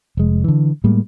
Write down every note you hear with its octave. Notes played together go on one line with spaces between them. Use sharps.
F1 G#3
D3 E3
A2 G3 G#3 A#3